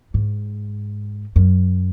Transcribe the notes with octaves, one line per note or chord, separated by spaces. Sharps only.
G#2
F#2